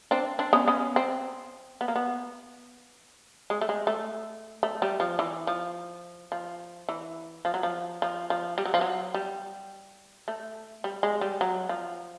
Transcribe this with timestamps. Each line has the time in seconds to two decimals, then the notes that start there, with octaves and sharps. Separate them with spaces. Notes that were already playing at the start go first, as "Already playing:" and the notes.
0.11 C4 D4
0.39 C4 D4
0.53 B3 C#4
0.68 B3 C#4
0.96 C4
1.81 B3
1.88 A#3
1.96 B3
3.50 G#3
3.61 A3
3.69 G#3
3.87 A3
4.63 A3
4.82 G3
5.00 F3
5.19 E3
5.47 F3
6.32 F3
6.89 E3
7.45 F3
7.54 F#3
7.63 F3
8.02 F3
8.30 F3
8.58 G3
8.65 F#3
8.74 F3
8.81 F#3
9.14 G3
10.28 A3
10.84 G3
11.03 G#3
11.21 G3
11.41 F#3
11.69 F3